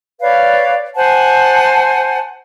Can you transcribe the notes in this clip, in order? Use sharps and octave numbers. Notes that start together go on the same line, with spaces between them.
B4 C#5 D5 F5
C5 F#5 G#5 A5